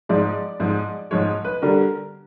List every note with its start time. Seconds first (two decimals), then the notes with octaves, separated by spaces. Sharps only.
0.09 G#2 F3 G#3 D5
0.60 G#2 F3 G#3
1.11 G#2 F3 G#3 C#5
1.45 B4
1.62 D3 G3 A#4